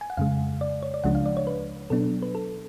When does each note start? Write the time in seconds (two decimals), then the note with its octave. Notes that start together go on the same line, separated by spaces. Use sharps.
0.01 G#5
0.10 F#5
0.17 F2 C#3 G#3 F5
0.61 D5
0.83 C#5
0.94 D5
1.04 C#2 C#3 F3 G#3 D4 F#5
1.15 F5
1.26 D5
1.37 C#5
1.47 B4
1.90 B2 F#3 B3 D4 A4
2.22 B4
2.35 A4